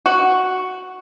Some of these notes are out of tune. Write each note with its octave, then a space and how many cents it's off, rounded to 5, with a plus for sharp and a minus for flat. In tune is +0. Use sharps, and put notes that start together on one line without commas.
F#4 +0